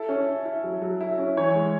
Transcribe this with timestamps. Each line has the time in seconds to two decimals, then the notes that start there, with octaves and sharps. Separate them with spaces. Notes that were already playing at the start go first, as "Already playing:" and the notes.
Already playing: E4 A4
0.09 C#4
0.26 E4
0.45 E4
0.64 F#3
0.82 F#3
1.01 E4
1.18 C#4
1.37 E3 C#5
1.55 G#3